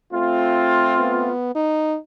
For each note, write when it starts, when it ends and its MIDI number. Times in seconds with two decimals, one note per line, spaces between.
0.13 1.30 57
0.13 1.30 60
0.13 1.30 65
0.99 1.53 59
1.55 1.97 63